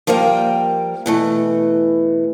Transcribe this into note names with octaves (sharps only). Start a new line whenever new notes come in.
F3 G3 A#3 A#4 G5
B2 E3 A3